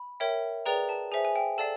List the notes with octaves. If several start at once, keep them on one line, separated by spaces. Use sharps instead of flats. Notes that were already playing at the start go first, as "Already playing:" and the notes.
Already playing: B5
A#4 C#5 E5 G5
G#4 B4 D5 G5 A#5
A5
G#4 C5 E5 G#5
G#5
G5
A4 D5 F5 A5